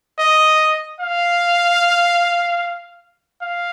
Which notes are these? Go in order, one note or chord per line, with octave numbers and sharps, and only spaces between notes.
D#5
F5
F5